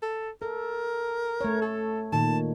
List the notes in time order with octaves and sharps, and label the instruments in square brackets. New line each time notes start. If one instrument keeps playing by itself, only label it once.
[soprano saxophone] A4
[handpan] A4 [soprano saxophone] A#4
[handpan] A3 C#5
[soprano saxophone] A4
[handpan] A#2 D#3 [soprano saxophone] A5